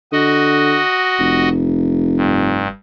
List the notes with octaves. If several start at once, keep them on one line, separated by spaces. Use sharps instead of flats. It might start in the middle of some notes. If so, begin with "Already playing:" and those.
D3 F#4 D#5
F1
G2